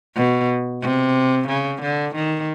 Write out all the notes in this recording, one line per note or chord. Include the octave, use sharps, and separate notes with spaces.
B2
C3
C#3
D3
D#3